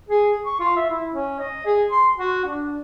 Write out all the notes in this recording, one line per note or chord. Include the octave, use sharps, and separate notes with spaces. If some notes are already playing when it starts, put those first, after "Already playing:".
G#4
C#6
F4
E5
E4
C#4
D#5
G#4
C6
F#4
D4